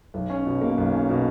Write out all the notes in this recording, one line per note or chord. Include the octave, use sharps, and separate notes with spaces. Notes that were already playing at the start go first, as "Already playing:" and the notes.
B1
C#4
B2
A#3
B1
C#4
B2